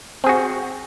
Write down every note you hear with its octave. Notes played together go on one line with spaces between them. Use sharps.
C4 F#4 G#4